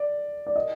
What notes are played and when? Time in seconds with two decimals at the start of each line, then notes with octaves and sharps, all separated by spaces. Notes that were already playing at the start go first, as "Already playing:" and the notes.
Already playing: D5
0.47 D5
0.56 D#5